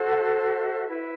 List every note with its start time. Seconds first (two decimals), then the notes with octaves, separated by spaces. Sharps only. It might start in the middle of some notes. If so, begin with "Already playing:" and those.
Already playing: F#4 A4 C5
0.12 F#5
0.18 E5
0.88 E4 B4